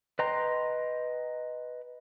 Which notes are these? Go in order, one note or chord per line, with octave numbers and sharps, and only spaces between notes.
B4 D#5 G5 A#5 C6